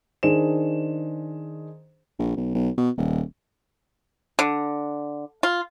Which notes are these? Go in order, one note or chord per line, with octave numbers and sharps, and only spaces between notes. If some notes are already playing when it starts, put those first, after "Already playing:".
D#3 D4 G#4 C5 E7
A#1
B1
B1
B2
D#1
D3
F4